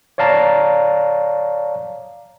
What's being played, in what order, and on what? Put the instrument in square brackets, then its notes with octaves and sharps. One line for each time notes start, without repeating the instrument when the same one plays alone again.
[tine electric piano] C#5 D5 F5 A5 A#5